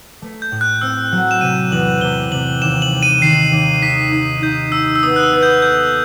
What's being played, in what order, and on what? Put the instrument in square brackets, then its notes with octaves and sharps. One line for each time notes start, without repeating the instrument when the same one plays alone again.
[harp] A3
[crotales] G6
[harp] A2
[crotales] F#6
[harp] C4 [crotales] E6
[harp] F#3
[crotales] E7
[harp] C3 [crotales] D#7
[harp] E2 [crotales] F#7
[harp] C3 [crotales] G7
[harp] C3 [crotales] F#7
[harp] D#2 [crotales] E7
[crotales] F#7
[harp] G3
[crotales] D#7
[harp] D#3 [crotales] C7
[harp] D#2
[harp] D#4 [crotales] B6
[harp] D#4
[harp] D#4 [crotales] G6
[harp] D#4 [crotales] E6
[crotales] E6
[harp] B3 [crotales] D#6
[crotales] F#6
E6
[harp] B3
[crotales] G6
[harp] A4 [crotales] G6